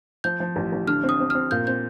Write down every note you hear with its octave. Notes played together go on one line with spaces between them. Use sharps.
F3 G6
F3
A1
A1
D3 F6
C4
D#6
C4
C4 F6
A#2 G6
C4 G6